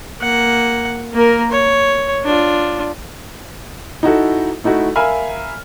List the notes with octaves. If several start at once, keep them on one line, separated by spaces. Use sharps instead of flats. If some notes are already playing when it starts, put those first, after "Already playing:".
A#3 F#5
A#3 A#4
C#5
D4 F4
D#4 E4 F#4 A4
A3 D#4 E4 F#4
A#4 E5 F5 G#5 B5 F6